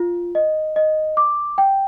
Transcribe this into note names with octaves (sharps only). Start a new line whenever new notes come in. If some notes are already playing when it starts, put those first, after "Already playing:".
Already playing: F4
D#5
D#5
D6
G5